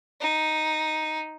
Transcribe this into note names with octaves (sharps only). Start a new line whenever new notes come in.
D#4